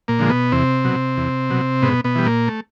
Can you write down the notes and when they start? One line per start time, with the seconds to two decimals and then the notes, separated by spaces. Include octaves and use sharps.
0.08 A#2 A#3
0.19 D3 F3 G#3
0.30 B2 B3
0.52 E2 C3 C4
0.85 B2 F#3
1.17 E2
1.50 B2 F#3
1.82 G#2 B2 B3
2.04 B2 B3
2.15 E3 G3
2.26 A#2 A#3
2.48 A3